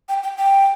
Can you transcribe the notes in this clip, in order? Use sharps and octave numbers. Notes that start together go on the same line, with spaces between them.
G5
G5
G5